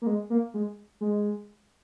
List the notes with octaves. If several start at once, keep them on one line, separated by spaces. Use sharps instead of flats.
A#3
G#3
A#3
G#3
G#3